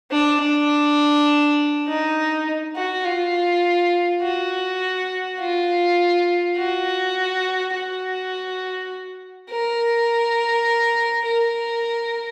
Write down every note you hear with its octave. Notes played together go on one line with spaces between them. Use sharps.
D4
D4
D#4
F#4
F4
F#4
F4
F#4
F#4
A#4
A#4